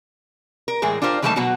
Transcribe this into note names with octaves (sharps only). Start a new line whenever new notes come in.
A#4
A2 E3 G#3 G#4 A#4
D4 F4 G4 A#4 C5
D#3 E3 G3 A3 A#3 A5
B2 F#3 B3 F#4 F#5